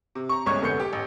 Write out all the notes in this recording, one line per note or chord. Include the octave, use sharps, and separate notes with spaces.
C3
A#5 C#6
G1 C2 G#3 C#4 C#6 G#6
F1 D3 B3 G6 C#7
G4
A1